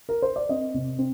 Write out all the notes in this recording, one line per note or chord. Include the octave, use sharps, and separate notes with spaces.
A#4
C5
D5
C4 D#5
C3
C4